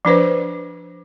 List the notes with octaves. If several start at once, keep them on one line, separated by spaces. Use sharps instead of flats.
F3 D4 B4 C5